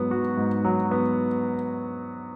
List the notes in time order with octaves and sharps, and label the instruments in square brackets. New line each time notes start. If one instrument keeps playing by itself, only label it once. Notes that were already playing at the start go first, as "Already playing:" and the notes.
Already playing: [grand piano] G#2 F#3 B3
F#4
G#2
F#3
B3